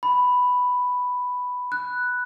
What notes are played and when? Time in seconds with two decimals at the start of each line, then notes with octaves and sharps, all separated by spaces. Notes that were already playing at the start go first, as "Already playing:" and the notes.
0.03 B5
1.72 F#6